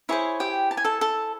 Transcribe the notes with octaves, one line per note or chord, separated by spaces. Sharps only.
E4 G#4 C5 C#5 C#6
G4 G5
A5
G#5
A4 A5
A4 A5